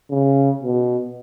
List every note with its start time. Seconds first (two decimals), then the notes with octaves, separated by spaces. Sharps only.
0.10 C#3
0.63 B2